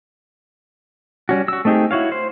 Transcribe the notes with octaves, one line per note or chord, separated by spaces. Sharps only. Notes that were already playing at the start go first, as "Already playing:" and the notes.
G3 C#4 F#4
F#4 E6
A3 C4 D#4 G4 G#4
E4 F#4 C#5 F5
C5